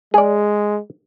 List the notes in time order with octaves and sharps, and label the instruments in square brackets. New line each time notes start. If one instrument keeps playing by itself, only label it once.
[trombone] G#3 [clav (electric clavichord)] G#4 D5